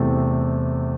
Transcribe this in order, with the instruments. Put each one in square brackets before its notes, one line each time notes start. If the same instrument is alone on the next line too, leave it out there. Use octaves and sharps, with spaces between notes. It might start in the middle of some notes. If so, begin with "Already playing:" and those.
Already playing: [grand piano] E2 C3 E3 A3 C4